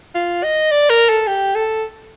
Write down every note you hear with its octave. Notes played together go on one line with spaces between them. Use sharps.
F4
D#5
D5
A#4
A4
G4
A4